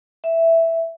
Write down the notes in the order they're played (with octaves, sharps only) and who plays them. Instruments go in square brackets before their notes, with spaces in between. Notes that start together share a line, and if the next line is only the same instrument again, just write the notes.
[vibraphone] E5